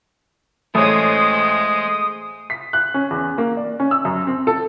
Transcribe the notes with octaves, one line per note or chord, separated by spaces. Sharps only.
A1 G#3 A3 C5 C#5 D#6
B6
F#6
C#4
E2
A#3
D5
C#4
E6
F#2
C4
A4